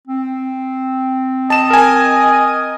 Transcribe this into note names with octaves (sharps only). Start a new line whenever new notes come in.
C4
D#5 A5 E7
A#4 G#5